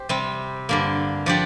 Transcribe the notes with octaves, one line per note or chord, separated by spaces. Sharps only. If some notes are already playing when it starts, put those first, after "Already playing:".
Already playing: G4 C5
C3 G3 C4
G2 D3 A#3
F3 D4 G4 D5